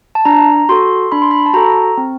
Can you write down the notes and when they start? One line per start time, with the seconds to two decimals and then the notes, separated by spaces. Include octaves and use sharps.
0.15 A5
0.25 D4 A#5
0.69 F#4 A4 C6
1.12 D4 B5
1.22 C6
1.31 B5
1.46 A5
1.54 F#4 A4 A#5
1.98 C4